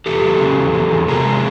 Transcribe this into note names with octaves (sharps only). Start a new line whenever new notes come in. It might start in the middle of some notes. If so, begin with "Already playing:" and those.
E2 G4 A4
F#3
C#3
E2
F#3
E2
C3 G#4 A#4
G#3